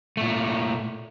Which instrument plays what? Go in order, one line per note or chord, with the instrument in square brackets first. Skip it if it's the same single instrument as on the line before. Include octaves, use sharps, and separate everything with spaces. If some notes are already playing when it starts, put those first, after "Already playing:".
[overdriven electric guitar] A#2 A3